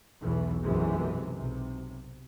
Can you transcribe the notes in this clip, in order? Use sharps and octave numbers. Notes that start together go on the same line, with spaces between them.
B1 E2 E3
B1 F#2 C3 E3 G#3
B1 C3